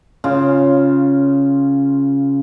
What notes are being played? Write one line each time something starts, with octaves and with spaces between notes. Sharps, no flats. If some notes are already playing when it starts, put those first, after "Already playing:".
C#3 F4